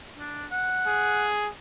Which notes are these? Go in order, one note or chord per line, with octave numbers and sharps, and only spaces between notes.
D4
F#5
G#4